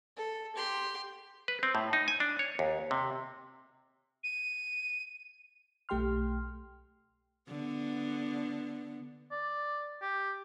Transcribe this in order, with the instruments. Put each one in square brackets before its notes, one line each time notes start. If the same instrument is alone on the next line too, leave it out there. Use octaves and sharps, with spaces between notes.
[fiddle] A4
G4 C6
[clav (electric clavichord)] B4
C4
A2
D#4
G#5
D4
C#5
D#2
C3
[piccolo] D#7
[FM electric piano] B1 A3 G4 G5 C6 F6
[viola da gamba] D3 B3
[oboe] D5
G4